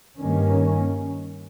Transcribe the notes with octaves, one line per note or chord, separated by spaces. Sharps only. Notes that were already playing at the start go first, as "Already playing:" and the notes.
G2 D#3 A#3 C#4